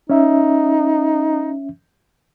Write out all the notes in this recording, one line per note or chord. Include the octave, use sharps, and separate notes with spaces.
C#4 D#4 E5